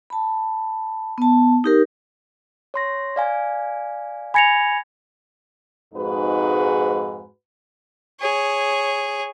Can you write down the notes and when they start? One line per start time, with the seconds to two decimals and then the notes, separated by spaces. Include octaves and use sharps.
0.10 A5 B5
1.18 B3 A5
1.64 D#4 G4 A#4
2.74 C#5 C6 A#6
3.16 D5 F5 G#5
4.34 G#5 B5 G#6 A#6 C#7 F7
5.94 F2 G#2 G#3 D#4 F#4 B4
8.21 G#4 C#5